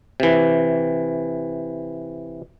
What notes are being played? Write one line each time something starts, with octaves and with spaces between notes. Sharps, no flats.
C3 E3